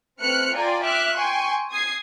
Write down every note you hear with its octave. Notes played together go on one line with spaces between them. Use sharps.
A3 C4 B4 F6 F#6 C#7
F4 D5 G5 G#5 A#5 C6
E5 D6 F6 F#6
G5 G#5 C6 C#6
D#6 G#6 C7